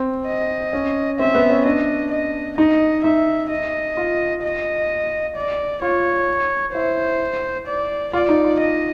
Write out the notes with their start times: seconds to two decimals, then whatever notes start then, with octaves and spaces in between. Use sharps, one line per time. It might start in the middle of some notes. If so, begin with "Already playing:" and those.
Already playing: C4
0.27 D#5
0.73 C#4
1.19 C4 E5
1.35 B3
1.50 C#4
1.65 D4 D#5
2.11 D#5
2.58 D#4 D#5
3.04 D#4 E5
3.51 D#5
3.97 F4
4.43 D#5
5.36 D5
5.82 F4 C#5
6.74 E4 C5
7.67 D5
8.13 F4 D5
8.29 D#4
8.44 F4
8.60 D#5